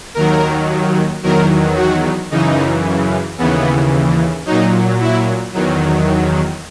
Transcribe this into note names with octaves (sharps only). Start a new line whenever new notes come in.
D#2 D#3 F#3 A#4
E2 D#3 F#3 A#4
F#4
F#2 C#3 E3 D#4
D#2 C#3 E3 B3
A#2 F#3 D#4
E4
E2 D#3 F#3